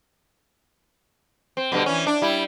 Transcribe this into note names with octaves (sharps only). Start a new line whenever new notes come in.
C4
B2 D3 G3
E3 C#4
D4
G3 E4